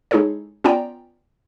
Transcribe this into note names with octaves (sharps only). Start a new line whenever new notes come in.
G#3 D#4 E4 G#4 A4 C#5
B3 C#4 F4 D5 G5 A#5